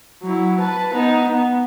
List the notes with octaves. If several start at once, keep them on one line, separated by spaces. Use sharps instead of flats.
F#3 E4
B4 A5
B3 D#4
B3